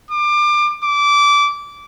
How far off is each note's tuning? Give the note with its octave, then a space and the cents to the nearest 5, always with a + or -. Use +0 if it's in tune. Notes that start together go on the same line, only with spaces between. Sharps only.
D6 +25
D6 -20